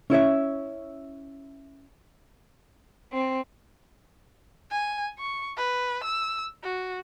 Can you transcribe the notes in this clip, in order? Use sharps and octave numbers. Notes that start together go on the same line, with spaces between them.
C#4 E4 C#5 E5
C4
G#5
C#6
B4
E6
F#4